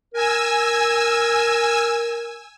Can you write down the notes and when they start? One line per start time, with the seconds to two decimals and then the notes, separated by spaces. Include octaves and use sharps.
0.13 A#4 G#5 E6